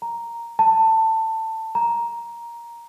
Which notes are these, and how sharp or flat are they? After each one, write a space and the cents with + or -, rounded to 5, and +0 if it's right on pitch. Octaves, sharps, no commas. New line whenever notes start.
A#5 +0
A5 +20
A#5 +10